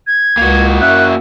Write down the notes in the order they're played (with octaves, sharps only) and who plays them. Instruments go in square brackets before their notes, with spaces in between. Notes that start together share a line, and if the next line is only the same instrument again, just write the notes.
[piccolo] G#6
[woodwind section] C#2 [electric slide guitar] A#3 F#4
[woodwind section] F#2 C#4 E5 [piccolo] F#6